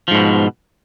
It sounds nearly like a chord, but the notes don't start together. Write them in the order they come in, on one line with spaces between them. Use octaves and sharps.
F3 G#2 B2